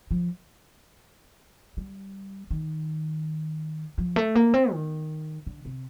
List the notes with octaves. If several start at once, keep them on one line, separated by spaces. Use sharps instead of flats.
F3
G3
D#3
F3
A3
A#3
C4
D#3
D3
C3